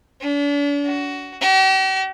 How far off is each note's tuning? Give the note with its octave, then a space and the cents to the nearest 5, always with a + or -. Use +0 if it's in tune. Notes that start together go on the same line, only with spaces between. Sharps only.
D4 -40
F#4 +15
G4 -45